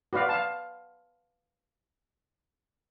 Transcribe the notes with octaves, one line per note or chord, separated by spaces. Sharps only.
F#4 B4 D5 F5
F5 A5